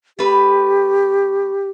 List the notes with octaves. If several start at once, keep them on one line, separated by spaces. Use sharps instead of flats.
A3 G4 B4